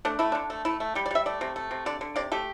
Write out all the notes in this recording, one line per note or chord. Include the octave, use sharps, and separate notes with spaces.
A3 D4
A3 E4
D3 D4
A3
A3 E4
A3
G3 G4
D5
G3 E5
A3 D5
C3
A3
C3
D3 D5
D3
C3 D5
A3 G4